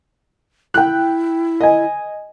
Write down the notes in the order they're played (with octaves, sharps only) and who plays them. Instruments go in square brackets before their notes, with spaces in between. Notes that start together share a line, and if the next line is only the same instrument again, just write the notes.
[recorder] E4 [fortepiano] G5 F#6
[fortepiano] D#5 G#5